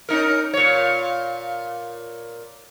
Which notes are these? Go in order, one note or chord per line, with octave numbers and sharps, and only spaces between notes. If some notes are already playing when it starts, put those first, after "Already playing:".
C#4 D#4 A#4
A#2 C#5